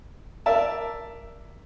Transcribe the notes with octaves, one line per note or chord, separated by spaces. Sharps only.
A#4 D5 E5 A5